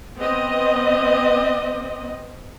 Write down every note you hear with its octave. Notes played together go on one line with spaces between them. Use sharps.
B3 C4 D#5